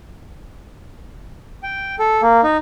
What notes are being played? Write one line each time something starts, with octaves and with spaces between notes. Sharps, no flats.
G5
A4
A#3
D#4